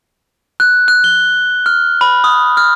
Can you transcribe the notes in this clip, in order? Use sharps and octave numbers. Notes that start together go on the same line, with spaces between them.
F#6
F#6
G7
F6
B5
D#6
F6